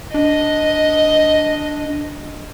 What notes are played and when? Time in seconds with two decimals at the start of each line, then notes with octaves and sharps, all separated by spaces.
0.14 D4 D#5